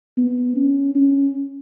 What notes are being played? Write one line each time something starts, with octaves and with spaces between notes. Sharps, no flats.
B3
C#4
C#4